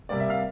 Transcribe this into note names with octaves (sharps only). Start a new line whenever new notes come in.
C3 G3 A#3 D5
E5
F5